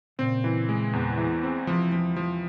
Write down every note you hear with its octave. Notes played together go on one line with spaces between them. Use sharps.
A#2 C#3 C4
E3
G#3
E2
E3
C4
C3 E3 F3
F3
F3